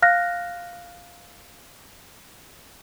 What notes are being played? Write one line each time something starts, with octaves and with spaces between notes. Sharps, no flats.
F5 F6 F#6 A#6